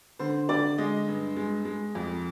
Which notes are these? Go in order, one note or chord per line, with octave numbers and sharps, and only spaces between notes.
D3 C5
D3 D5
G#3 D#5
G2
G#3
G#3
F2